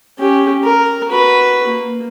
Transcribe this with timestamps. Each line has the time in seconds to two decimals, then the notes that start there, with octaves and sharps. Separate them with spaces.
0.19 C#4 G4
0.64 A#4
1.08 F#4 B4
1.67 A#3